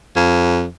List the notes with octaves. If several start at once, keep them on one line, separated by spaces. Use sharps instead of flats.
F2